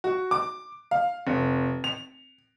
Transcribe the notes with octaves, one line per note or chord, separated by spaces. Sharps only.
F#4
D6
F5
F1
F7